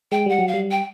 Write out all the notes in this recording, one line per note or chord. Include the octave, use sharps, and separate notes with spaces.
G#3 G5
G3 F#5
F#3
F5
G3
G5